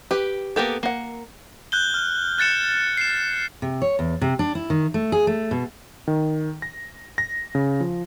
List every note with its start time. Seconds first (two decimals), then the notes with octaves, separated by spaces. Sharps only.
0.11 G4 B4
0.56 A#3 B3 G4 A4
0.83 A#3 F#5
1.72 F#6 G6 G7
1.94 F6
2.38 F#6 A6 C#7 E7
2.97 C7 E7
3.62 C3
3.82 C#5
3.99 E2
4.21 C3
4.39 D4
4.55 E4
4.70 D#3
4.94 A3
5.12 G#4
5.27 A3
5.51 B2
6.08 D#3
6.62 A#6
7.18 A#6
7.55 C#3
7.80 F3